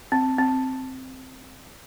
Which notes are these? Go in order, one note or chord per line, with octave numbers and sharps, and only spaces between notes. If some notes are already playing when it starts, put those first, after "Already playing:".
C4
C4